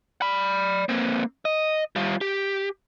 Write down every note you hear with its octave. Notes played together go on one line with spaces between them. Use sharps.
D5 B5
A#3 C4
D#5
G3 F4
G4